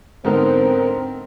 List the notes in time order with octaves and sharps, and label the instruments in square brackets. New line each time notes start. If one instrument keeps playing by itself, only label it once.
[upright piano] G#2 D3 B3 [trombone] C4 [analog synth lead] A#4